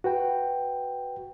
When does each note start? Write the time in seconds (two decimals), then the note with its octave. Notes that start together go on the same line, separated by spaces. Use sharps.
0.04 F#4 B4 G5